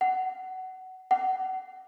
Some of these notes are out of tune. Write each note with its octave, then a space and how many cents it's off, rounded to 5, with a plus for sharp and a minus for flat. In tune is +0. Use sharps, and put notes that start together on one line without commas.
F#5 +20
F#5 +30